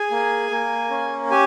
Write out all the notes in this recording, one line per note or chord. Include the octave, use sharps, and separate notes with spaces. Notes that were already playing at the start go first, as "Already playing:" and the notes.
Already playing: G#4 G#5
A#3
A#3
C#4
G4 G#5